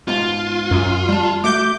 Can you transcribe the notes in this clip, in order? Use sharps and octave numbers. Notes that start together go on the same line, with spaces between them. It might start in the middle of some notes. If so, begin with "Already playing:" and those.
G#2 B2 F4
F#2
G3 A5
A3 F#4 E5 D6 G6